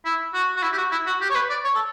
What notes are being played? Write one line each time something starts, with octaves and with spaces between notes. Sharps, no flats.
E4
F#4
F#4
E4
G4
F#4
E4
F#4
G4
C#5
B4
D5
C#5
A4